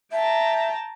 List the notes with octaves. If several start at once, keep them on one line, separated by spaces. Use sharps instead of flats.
E5 G5 A5 A#5